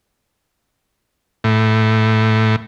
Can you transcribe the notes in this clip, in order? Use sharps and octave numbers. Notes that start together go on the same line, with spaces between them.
A2